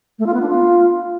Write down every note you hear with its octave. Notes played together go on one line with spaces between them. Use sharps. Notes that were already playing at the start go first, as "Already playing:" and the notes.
A3
F4
B3
D4
F4